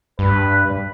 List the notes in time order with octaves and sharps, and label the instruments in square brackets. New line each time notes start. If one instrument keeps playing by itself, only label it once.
[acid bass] G2 [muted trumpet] B4